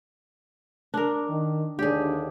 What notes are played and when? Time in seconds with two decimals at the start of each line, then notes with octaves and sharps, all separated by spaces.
0.94 D4 A#4
1.29 D#3
1.79 D#2 D3 D4 G4 G#4